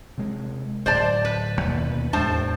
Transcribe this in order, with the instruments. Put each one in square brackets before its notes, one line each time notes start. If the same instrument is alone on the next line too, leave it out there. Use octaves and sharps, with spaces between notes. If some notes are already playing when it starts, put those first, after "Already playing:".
[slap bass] C3 G#3
[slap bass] D1 [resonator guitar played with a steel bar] C5 D5 A5
[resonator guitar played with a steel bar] B4
[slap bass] D#2 B2 A#3
[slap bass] E2 G#3 D4 [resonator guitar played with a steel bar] A2 C5 A5